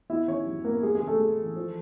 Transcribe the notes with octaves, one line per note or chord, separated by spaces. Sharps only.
B3 E4 E5
D#3 C#4 C#5
F#2
A#3 B3 A#4
G#3 G#4
G#3 G#4
C#3
A3 A4
G#3
E3
F3